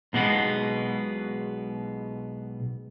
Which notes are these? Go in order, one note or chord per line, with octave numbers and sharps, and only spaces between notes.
B1 B2 G#3 B3